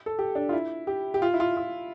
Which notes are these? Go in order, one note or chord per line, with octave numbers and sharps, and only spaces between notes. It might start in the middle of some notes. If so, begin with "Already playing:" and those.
A4
G4
D4
F4
E4
G4
G4
F4
E4
F4
F4